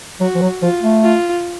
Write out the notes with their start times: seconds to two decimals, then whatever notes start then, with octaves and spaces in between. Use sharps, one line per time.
0.20 F#3 F#4
0.35 F3
0.41 F#3
0.62 F3 F4
0.83 A3
1.03 F4